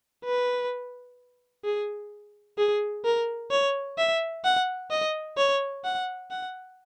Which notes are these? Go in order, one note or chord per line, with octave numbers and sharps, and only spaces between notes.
B4
G#4
G#4
A#4
C#5
E5
F#5
D#5
C#5
F#5
F#5